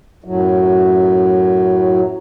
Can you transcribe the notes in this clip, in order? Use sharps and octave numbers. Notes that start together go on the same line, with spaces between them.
F#2 A2 F#3